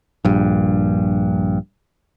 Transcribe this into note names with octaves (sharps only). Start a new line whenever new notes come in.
A#1 G2